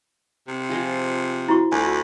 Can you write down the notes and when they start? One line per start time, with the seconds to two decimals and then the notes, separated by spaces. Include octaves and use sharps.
0.48 C3
0.69 F3 G#3 F4
1.48 E4 F#4 C#6
1.72 D2 B4 G#5